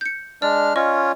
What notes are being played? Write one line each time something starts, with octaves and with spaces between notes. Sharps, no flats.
G6 C#7
G#3 D4 D5 F6
C#4 F4 C#5 D#5 C#6